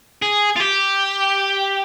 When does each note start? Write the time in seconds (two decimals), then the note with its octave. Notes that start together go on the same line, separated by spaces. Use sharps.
0.22 G#4
0.56 F4
0.60 G4